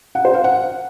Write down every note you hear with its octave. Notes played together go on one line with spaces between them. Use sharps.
F#5
C5
F5
F#5